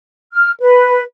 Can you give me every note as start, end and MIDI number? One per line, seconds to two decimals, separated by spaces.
0.33 0.51 89
0.61 1.02 71